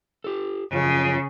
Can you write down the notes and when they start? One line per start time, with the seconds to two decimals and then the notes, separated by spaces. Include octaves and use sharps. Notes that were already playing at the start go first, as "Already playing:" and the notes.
0.24 G4 A4
0.72 F#2 C#3 F3